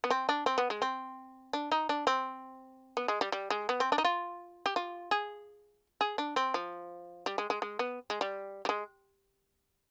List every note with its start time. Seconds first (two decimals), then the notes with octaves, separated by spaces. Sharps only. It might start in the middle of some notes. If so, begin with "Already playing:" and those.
0.04 B3
0.10 C4
0.29 D4
0.46 C4
0.58 B3
0.70 G#3
0.82 C4
1.53 D4
1.72 D#4
1.89 D4
2.07 C4
2.97 B3
3.08 G#3
3.21 G3
3.32 G3
3.50 G#3
3.69 B3
3.80 C4
3.92 D4
3.98 D#4
4.05 F4
4.66 G4
4.76 F4
5.11 G#4
6.01 G#4
6.18 D4
6.36 C4
6.54 F3
7.26 G3
7.38 G#3
7.50 G#3
7.62 G#3
7.79 B3
8.10 G#3
8.21 G3
8.65 G3
8.69 G#3